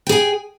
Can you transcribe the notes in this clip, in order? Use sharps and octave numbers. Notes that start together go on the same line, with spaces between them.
G#4 G5 G#5